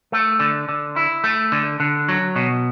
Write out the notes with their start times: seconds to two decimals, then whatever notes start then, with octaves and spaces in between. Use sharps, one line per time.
0.12 A3
0.40 D3
0.69 D3
0.96 E4
1.24 A3
1.52 D3
1.80 D3
2.09 F#3
2.36 B2